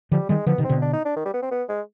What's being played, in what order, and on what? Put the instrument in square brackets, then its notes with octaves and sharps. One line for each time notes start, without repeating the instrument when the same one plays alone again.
[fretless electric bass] D3 F3 [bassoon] G3
[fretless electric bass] D#3 G3 [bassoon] G#3
[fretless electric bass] D3 F3 [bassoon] B3
[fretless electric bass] C3 D#3
[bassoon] C4
[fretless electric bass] B2 D3
[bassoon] D4
D#4
D4
D#3
G3
B3
C4
B3
G#3